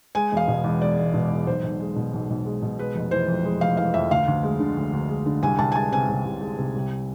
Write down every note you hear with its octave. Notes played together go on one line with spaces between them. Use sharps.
G#3 G#5
E1 F5
B2
E2
G#3 D5
E1
B2
E2
B1 C5
B1
G#3
B2
B1
B1
G#3
B2
G#3 B4
F1
E3 C5
F2
G#3
F1 F5
E3 F5
F2 E5
D2 F5
D2
G#3
D3
D2
D2
G#3
D3
C2 G#5
C2 A5
G#5
G#3 A5
C3 G#5
C2
C2
G#3
C3
C2